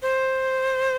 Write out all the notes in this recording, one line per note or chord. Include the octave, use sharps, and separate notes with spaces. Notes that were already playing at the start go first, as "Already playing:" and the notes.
C5